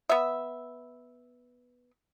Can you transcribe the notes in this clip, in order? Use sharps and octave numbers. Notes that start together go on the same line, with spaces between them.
B3 E5